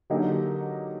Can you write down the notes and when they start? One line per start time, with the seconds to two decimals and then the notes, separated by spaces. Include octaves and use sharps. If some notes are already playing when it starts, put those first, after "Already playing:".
0.10 D3 F#3 A#3 D#4 G4